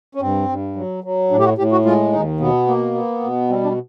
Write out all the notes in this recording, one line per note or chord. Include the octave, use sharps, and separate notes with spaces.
C#4
G2 C4
G2
F#3
F#3
A2 D4
G4
F#4
A2 G4
F#4
G#3 F4
D#2 D#4
B2 B3
A#3
B3
B2
G3 C4
D4